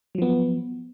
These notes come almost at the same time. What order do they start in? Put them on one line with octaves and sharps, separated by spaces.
F#3 F3 B3